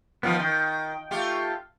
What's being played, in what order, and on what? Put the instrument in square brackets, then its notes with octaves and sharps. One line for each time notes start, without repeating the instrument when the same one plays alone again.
[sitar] D#3 F3 [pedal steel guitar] B3 F4 B4
[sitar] D#3 [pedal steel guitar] G5
[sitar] A3 F4 G4